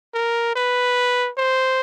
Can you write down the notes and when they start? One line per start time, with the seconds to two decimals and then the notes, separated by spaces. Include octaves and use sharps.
0.15 A#4
0.56 B4
1.38 C5